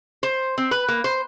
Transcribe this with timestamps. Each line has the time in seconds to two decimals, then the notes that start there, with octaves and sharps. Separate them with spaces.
0.23 C5
0.58 C4
0.71 B4
0.88 A#3
1.04 C5